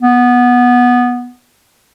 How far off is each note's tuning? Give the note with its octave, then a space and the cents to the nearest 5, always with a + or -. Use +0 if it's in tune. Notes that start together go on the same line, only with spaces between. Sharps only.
B3 -10